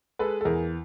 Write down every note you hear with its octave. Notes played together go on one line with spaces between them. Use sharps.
G#3 A4 B4
A4
E2 G#4 A#4